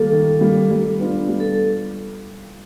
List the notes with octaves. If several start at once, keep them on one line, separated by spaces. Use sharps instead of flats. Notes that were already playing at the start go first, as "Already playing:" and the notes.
Already playing: D#3 G3 A#3 A4
D#3
G3 A#3
G3
B3 D4 F4
G3
A4